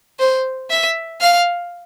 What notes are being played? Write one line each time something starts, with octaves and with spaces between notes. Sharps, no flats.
C5
E5
F5